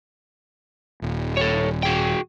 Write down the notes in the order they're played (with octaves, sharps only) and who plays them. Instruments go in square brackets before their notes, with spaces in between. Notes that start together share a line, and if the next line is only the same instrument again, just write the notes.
[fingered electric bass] D#1
[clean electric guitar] A4 C#5
F#4 G#4 G5